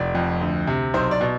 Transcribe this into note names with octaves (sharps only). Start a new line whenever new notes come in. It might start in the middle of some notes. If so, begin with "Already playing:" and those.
Already playing: F1 D5
F2
D2
C3
B1 C5
D5
B2